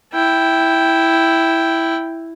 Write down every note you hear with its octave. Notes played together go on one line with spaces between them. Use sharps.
E4 G5